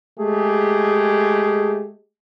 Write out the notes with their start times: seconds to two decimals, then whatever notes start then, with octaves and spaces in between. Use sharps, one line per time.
0.19 G#3 A3 G4 G#4